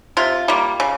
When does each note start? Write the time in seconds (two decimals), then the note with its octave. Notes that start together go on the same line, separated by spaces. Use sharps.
0.17 C3 F4
0.48 G3 A#3
0.80 C#3